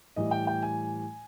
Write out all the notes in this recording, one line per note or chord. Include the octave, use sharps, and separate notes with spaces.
A2 E3 G3 D#5
G5
G5
G#5